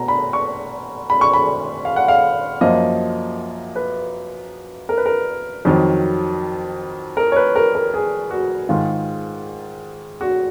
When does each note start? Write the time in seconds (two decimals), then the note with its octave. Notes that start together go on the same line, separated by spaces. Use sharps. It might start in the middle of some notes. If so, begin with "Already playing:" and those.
Already playing: B2 A#5
0.08 B5
0.33 C#6
1.10 B5
1.21 C#6
1.33 B5
1.85 F5
1.96 F#5
2.08 F5
2.61 F#2 F3 A#3 D#5
3.76 B4
4.89 A#4
4.98 B4
5.06 A#4
5.65 F2 D#3 F#3
7.17 A#4
7.32 C#5
7.36 B4
7.56 A#4
7.75 A#4
7.94 G#4
8.31 F#4
8.69 G#2 D#3 G#3 F4
10.21 F#4